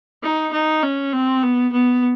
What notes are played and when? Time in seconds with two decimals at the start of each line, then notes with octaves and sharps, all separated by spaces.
0.23 D#4
0.53 D#4
0.82 C#4
1.13 C4
1.43 B3
1.72 B3